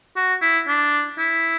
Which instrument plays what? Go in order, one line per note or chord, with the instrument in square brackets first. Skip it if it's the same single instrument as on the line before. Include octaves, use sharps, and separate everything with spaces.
[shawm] F#4
E4
D4
E4